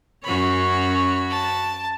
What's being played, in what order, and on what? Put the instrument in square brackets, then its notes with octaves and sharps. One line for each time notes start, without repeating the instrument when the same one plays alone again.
[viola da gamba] F#2 C#4 C#5 [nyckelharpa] F#4 B5
[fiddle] A5